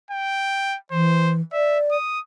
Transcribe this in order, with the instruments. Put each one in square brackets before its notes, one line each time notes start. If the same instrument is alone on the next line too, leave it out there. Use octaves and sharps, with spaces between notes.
[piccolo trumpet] G5
[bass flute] E3 [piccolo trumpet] C5
[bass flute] D5 [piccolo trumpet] E5
[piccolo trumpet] D#6